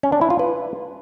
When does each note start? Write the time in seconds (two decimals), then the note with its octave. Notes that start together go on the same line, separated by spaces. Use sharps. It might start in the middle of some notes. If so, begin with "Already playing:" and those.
0.03 C#4
0.12 D4
0.21 E4
0.30 F4
0.39 B4